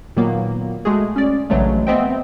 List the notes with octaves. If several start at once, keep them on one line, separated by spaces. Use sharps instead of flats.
A#2 D#3 F#3 A#3 B3
G#3 A3 F#4 G#4
C#4 D5
A#1 C#3 E3 F#3 G#3 A3
B3 C4 C5 D#5 E5 G5